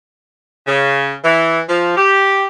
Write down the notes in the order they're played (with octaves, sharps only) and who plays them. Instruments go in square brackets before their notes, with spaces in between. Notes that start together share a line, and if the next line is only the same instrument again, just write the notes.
[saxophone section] C#3
E3
F3
G4